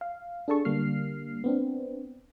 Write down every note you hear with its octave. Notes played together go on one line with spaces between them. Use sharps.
F5
D4 G#4 A4 A5 C#6
D3 G3 A#3 F6 C7
B3 C4 D4